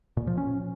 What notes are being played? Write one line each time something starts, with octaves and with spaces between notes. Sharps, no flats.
A#2
F3
C#4